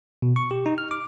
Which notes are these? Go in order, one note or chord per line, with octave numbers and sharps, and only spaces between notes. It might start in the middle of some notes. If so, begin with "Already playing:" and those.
B2
C#6
G4
D#4
F6
D6